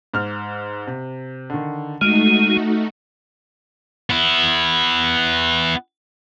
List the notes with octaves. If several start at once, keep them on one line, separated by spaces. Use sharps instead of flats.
G#2 F6
C3
D3 D#3
G#3 A3 D#4 F#4 F6 D7
B3 E4